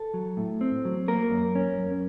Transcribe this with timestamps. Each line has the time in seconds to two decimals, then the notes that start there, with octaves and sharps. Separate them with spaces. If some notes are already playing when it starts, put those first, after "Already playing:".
Already playing: A4
0.14 F#3
0.37 A2
0.61 C4
0.85 F#3
1.08 A#3 A#4
1.31 F#2
1.55 C#4
1.79 F#2